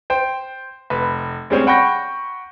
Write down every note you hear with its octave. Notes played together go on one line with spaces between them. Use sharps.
C5 G5
F1 B4
D2 G3 G#3 C4 C#4
F#5 G5 B5 C#6 G6 A#6